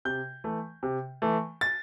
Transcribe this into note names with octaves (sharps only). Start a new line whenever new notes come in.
C3 G6
E3 A3
C3
E3 A3
A6